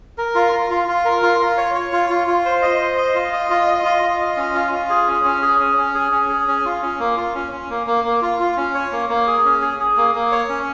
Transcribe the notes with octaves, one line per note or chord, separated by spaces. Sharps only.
A#4
F4
F4
F4
F4
A#4
F4
F4
C#5
C#5
F4
F4
F4
C5
D#5
C5
D#5
F4
D#5
F4
D#5
F4
F4
D#5
C#4
F4
F4
G#4
C#4
C#4
G#4
C#4
C#4
G#4
C#4
G#4
C#4
F4
C#4
A#3
F4
C#4
C#4
A#3
A#3
A#3
F4
F4
C#4
C#5
A#3
A#3
G#4
C#4
G#4
G#4
A#3
A#3
C#5
C#4